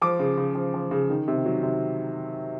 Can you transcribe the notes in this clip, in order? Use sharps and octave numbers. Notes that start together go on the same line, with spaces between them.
F3 D6
C#3
C#3
F3
F3
C#3
D#3
C3
F#3
C3